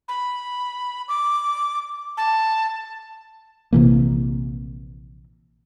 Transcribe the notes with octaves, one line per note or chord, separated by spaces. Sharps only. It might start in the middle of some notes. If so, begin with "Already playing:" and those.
B5
D6
A5
A#1 C3 E3 A#3